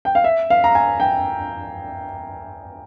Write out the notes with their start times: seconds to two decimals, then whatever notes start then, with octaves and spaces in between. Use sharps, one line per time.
0.05 G5
0.15 F5
0.24 E5
0.50 F5
0.64 A#5
0.75 G#5
1.00 G5